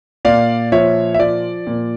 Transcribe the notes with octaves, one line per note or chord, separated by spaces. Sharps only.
A#2 D5 F5
F3 C#5 E5
E5
F3 D5
A#2